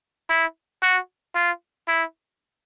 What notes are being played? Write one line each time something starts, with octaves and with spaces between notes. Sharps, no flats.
E4
F#4
F4
E4